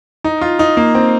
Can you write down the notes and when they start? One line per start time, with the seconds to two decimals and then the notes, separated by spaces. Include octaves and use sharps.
0.24 D#4
0.41 F4
0.59 D#4
0.77 A#3
0.95 C4